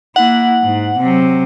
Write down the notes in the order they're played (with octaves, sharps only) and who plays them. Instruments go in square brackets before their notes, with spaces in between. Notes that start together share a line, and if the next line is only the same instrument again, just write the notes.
[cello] A#3 E4 [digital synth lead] F#5
[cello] G#2
C3 F#3